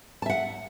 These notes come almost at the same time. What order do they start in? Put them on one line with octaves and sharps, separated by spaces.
A5 E5 F#5